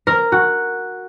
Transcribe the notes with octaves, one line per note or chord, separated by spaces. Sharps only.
A#4
F#4